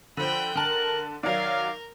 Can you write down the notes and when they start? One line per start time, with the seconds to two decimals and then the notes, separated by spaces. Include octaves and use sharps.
0.17 D3 F3 G5 B5
0.55 D3 A#4 A5 F#6
1.23 D#3 F#3 A#4 D5 F5